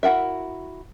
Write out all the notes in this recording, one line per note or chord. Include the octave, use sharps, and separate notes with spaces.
E4 F#4 A#4 E5